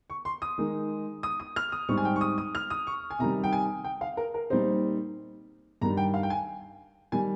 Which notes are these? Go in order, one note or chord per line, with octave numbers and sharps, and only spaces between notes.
C#6
C6
D#6
D#3 G#3 D#4
D#6
D#6
F6
D#6
G#2 G3 C4 D#4 C#6
G#5
G5
C#6
D#6
D#6
F6
D#6
C#6
G#5
C3 D#3 G3 A#5
G5
G#5
G5
F5
A#4
A#4
A#2 G3 C4 D#4 C5
G2 D#3 G3 A#5
G5
F5
G5
G#5
D#3 G3 G#5